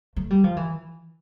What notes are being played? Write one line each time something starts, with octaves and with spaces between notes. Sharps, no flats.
A3
G3
F3
E3